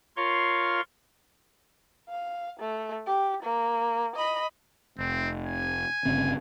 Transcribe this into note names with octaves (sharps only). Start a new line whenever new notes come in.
F4 A#4 C#5 F5 C6 C#6
F5
A3
G4
A#3
D#5 B5
F1 C4
G#5
G1 C#3 C4